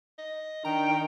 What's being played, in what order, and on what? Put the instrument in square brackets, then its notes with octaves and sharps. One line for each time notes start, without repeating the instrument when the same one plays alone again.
[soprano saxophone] D#5
[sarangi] D#3 [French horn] D4 [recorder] G5 [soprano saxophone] A#5